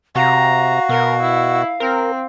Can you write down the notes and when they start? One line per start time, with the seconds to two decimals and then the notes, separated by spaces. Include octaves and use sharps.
0.15 C3 F#4 F5 A#5
0.89 B2 A#4
1.22 E4
1.80 C4 A#4